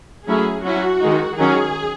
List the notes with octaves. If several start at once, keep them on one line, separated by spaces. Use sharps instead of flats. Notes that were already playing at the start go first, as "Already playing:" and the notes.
F#3 A3 C#4 E4 G#4
F#3 C#4 E4 F#4
D#3 G#3 D#4
D#3 F#3 C#4 G#4